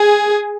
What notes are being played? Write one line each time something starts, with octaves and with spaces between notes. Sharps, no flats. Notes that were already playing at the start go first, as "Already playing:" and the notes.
Already playing: G#4